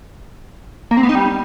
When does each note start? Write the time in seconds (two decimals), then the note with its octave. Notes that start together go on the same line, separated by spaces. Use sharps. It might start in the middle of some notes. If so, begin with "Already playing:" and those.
0.91 A#3
0.97 C4
1.03 B3
1.09 D#4
1.15 G3